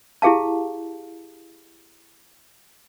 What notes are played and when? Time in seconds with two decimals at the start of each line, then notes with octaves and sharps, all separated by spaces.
0.22 E4 G4 G#4 F5 A5